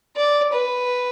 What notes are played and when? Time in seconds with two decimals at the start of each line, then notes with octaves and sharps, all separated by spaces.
0.16 D5
0.53 B4